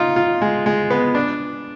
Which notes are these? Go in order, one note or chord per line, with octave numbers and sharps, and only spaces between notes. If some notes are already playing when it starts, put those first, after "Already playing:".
Already playing: D#4 F4
F4
G#3
G#3
B3
D4